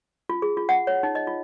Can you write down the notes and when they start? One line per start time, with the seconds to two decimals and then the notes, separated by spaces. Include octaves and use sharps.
0.29 F4
0.42 G#4
0.57 F4
0.69 F#5
0.87 C#5
1.03 D#4
1.15 D#5
1.27 F4